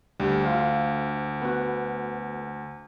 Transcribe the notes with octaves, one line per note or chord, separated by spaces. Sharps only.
D2 G3
F4 F5
B3 F#4